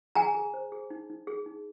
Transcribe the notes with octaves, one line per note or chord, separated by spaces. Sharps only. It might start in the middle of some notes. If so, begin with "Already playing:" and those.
G#4 G#5 A#5
G#4
C5
G#4
D#4
D#4
G#4
D#4